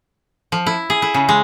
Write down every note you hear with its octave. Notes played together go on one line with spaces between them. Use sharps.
F3
E4
G#4
E4
C#3
G#3